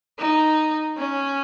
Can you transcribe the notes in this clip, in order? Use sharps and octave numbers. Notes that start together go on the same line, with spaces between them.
D#4
C#4